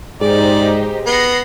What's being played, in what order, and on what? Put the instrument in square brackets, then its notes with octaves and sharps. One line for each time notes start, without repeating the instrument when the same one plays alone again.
[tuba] G#2 [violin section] D#4 G4 C5 [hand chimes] G#4 [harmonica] D5
[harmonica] B3 [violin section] A#6 C7